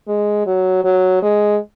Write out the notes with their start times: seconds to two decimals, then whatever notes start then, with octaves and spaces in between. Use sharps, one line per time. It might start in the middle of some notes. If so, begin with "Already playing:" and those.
0.08 G#3
0.46 F#3
0.84 F#3
1.23 G#3